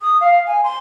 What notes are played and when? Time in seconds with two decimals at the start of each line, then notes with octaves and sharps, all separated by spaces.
0.01 D#6
0.21 F5
0.47 G#5
0.64 C6